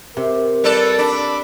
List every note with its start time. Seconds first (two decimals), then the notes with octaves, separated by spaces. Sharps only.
0.17 C3 A#4
0.64 G3 A4 B4 D5
0.99 D4 B5 D6